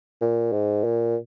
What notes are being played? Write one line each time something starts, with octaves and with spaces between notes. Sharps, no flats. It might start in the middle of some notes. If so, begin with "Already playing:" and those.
A#2
G#2
A#2